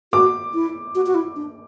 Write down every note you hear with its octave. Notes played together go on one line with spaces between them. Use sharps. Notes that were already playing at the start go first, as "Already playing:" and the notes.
F#4 D6
E4
F#4
F#4
E4
D4